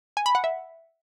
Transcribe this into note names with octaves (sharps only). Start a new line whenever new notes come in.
G#5
B5
F#5
E5